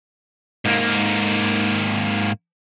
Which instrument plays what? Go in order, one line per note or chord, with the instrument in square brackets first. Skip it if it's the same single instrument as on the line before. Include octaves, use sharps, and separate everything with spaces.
[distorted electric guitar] G#2 A#3